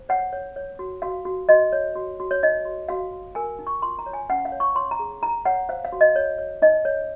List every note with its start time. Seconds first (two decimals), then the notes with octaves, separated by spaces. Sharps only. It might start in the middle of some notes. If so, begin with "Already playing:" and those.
Already playing: C5
0.09 C#5 F#5
0.33 C#5
0.56 C#5
0.79 F#4
1.02 F#4 F5
1.25 F#4
1.49 F#4 D#5
1.73 C#5
1.95 F#4
2.20 F#4
2.31 C#5
2.43 D#4 D#5
2.65 F#4
2.89 F#4 F5
3.13 F#4
3.35 A#4 G#5
3.59 D#4
3.67 C#6
3.82 F4 C6
3.99 A#5
4.06 C#5
4.13 G#5
4.29 C#4 F#5
4.45 F5
4.52 C#5
4.60 C#6
4.75 C#5 C6
4.91 A#5
4.99 G#4
5.22 D#4 A#5
5.45 C#5 F#5
5.69 C5 F5
5.85 F5
5.92 F#4
6.01 D#5
6.16 C#5
6.38 C#5
6.62 D#4 D#5
6.85 C#5